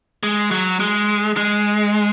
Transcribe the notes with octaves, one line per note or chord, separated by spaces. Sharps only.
G#3
F#3
G#3
G#3